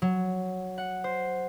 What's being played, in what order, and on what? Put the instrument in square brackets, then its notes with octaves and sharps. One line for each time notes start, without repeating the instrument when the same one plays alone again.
[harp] F#3
F#5
C5